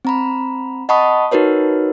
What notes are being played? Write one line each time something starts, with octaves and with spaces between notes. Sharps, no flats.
C4 A#5 B5
D#5 F#5 A5 B5 C#6 D#6
D#4 F#4 A#4 B4 C#5